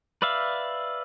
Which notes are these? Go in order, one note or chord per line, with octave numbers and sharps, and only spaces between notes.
B4 D5 E5 F5